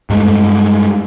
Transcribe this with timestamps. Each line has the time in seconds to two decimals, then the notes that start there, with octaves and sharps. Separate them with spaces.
0.10 G2 G#3 A3